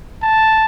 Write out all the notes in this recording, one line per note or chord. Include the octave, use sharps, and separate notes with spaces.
A5